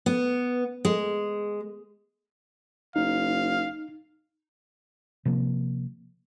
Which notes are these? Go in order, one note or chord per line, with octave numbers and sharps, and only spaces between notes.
B3
G#3
F#1 D#4 F5
C3 F3 A#3